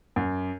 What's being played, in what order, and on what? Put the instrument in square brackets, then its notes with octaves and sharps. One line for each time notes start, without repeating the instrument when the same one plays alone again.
[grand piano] F#2